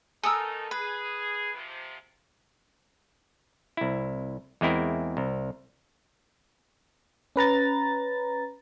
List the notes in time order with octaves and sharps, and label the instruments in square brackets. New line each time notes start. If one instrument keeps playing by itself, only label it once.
[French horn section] B2 A3 D#4 [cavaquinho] A4 A#4 [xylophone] G#5 D#6 E6
[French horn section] G#4 [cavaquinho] B4
[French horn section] C3 F3
[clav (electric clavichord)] C2 E4
E2 G#3 C4 E4 A#4
C2
[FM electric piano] C#4 B4 A#5 A6